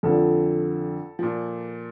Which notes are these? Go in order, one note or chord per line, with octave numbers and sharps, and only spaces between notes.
F2 D3 F3 A4
A#2 F3